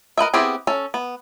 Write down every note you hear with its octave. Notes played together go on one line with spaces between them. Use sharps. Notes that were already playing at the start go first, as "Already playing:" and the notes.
A#4 B4 D#5 E5
B3 C4 E4 G4 G#4
C#4 A4
B3